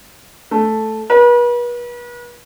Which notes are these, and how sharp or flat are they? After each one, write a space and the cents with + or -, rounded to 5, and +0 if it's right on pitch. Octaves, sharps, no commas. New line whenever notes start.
A3 -5
B4 -40